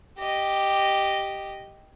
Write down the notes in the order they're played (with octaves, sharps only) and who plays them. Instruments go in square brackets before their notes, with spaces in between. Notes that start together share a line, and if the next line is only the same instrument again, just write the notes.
[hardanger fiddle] G4 D#5